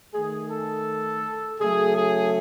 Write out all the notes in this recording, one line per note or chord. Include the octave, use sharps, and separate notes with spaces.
D#3 A3 G#4
A4
C#3 F#3 A3 G#4
G#4